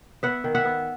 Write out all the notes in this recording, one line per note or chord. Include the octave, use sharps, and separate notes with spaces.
B3 E5 F#5
D#3
E5 F#5
B3